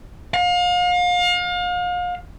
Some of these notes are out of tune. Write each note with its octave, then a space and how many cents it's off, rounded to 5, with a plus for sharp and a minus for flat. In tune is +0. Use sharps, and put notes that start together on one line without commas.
F5 +35